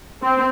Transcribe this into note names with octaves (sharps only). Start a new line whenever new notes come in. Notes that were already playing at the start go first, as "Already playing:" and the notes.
C4